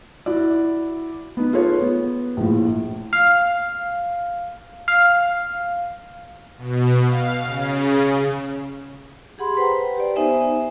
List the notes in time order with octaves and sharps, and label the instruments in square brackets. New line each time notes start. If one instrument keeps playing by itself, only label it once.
[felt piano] E4 F#4 D5
B3 D#4
F4 G#4 A4 B4 C#5
B3
A#1 A2 F3
[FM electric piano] F5
F5
[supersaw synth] B2
F5
C#3
[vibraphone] G4 G#4 F#5 B5 C6
B4 C5 F#5 G5 A#5
G4 D5
B3 D#4 C5 E5 G#5